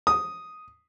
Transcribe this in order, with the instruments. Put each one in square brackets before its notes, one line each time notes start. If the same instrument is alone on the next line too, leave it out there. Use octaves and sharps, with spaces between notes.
[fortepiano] D#6